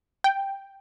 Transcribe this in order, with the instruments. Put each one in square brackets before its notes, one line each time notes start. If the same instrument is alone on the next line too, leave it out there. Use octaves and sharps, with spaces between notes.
[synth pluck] G5